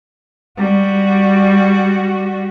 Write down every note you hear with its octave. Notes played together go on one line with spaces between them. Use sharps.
G3 F#4